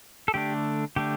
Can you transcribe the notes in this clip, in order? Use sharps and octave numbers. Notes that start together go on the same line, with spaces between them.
A4
D3 A3 D4 G4
D3 A3 D4 G4